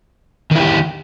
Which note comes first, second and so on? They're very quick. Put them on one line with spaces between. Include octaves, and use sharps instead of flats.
D#3 E4 G4